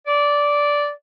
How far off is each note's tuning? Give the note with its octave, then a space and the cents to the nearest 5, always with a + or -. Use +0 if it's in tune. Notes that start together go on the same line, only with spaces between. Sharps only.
D5 -10